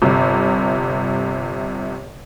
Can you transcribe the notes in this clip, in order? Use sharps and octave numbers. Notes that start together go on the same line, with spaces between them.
G1 C3